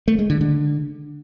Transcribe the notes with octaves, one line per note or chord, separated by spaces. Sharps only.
A3
G#3
D3
D3